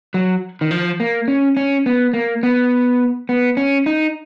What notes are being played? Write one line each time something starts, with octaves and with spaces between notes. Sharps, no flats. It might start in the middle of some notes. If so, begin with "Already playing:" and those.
F#3
D#3
F3
A#3
C#4
C#4
B3
A#3
B3
B3
C#4
D#4